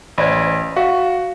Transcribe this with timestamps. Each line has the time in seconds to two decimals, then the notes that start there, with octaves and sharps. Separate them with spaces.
0.18 A1 C5 D5 B5
0.76 F#4 F5